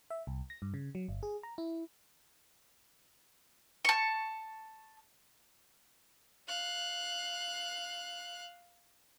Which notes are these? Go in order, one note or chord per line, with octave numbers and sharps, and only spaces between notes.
E5
C2
A#6
G2
C#3
F#3
G1
G#4
A#5
E4
A5 C#6
F5 F#6